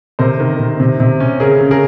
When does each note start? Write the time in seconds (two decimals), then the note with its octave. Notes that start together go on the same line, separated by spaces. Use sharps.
0.19 C3 A#4 C5
0.40 D#3
0.60 C3
0.80 C3
1.00 C3
1.20 C#4
1.40 C#3 G#4 A#4
1.61 C#3
1.71 G#4 A#4